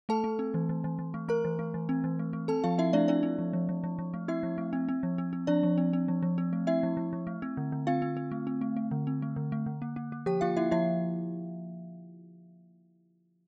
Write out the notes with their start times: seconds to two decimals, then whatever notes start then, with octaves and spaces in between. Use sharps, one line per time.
0.09 A3 A4 A5
0.24 A3
0.39 C4
0.54 E3
0.69 E3
0.84 E3
0.99 E3
1.14 A3
1.28 A3 A#4 A#5
1.45 E3
1.59 A3
1.74 E3
1.89 C4
2.04 E3
2.19 A3
2.33 A3
2.48 C4 A4 A5
2.64 F3 F4 F5
2.78 C4 E4 E5
2.93 A3 D4 D5
3.08 C4 D4 D5
3.23 C4
3.39 F3
3.53 F3
3.69 F3
3.84 F3
3.99 F3
4.14 A3
4.28 C4 E4 E5
4.43 F3
4.58 A3
4.73 C4
4.89 C4
5.03 F3
5.18 C4
5.33 C4
5.47 F3 D4 D5
5.63 F3
5.78 C4
5.93 C4
6.08 F3
6.23 F3
6.38 C4
6.53 A3
6.67 C4 E4 E5
6.83 F3
6.97 F3
7.13 F3
7.27 A3
7.42 C4
7.57 D3
7.72 D3
7.87 C4 F4 F5
8.02 C4
8.17 C4
8.31 A3
8.47 C4
8.61 A3
8.77 A3
8.91 D3
9.07 C4
9.22 A3
9.36 D3
9.52 A3
9.66 D3
9.82 A#3
9.96 A#3
10.12 A#3
10.26 F3 G4 G5
10.41 A#3 F4 F5
10.57 A#3 E4 E5
10.71 F3 E4 E5